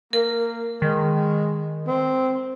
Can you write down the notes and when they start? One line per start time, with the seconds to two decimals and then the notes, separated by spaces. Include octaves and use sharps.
0.13 A#3 A#4
0.82 D#3 G#3
1.87 C4